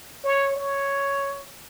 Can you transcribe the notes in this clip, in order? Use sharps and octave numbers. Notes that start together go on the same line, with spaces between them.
C#5
C#5